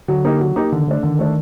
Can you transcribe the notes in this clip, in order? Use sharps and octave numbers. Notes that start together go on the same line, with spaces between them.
D3 F#3
A#3 D#4 G4
F#3
A#3 D#4 G4
D3 D#3
D3 A3 D4
D3 D#3
A3 D4